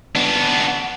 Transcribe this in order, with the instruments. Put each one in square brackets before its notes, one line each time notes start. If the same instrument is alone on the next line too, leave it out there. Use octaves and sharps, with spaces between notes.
[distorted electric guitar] B3 D4